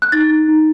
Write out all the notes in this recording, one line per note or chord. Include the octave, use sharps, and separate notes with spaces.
F#6
D#4 A6
D#4
D#4